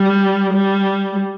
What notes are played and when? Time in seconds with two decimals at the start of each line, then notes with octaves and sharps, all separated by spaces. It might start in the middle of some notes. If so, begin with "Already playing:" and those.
Already playing: G3
0.53 G3